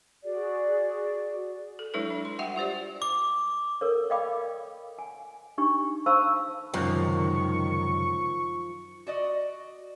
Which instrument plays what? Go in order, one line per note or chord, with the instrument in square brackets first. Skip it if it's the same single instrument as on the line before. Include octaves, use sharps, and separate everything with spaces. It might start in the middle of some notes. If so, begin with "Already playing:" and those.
[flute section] F#4 G#4 D5
[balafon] A4
F#3 G#3 D4 E4 A4 B4
D4
C6
G3 F#4 E5 F#5 G5
F4 G4 C5 D5
[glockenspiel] D6
[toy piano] A4 A#4 C#5
D5 D#5 F5 G5 B5 D6
G#5
D4 D#4 G4 C#6
C5 F5 A5 B5 C#6 E6
[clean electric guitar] C#2 F#2 C3 [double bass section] D#3 [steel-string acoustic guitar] F3 [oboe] C#6
[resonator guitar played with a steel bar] F#4 D5 D#5